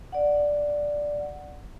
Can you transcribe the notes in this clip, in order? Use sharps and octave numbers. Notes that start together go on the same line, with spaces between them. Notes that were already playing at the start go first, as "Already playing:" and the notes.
D5 F#5